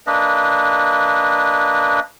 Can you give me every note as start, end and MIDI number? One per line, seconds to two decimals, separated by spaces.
0.07 2.00 58
0.07 2.00 62
0.07 2.00 71
0.07 2.00 75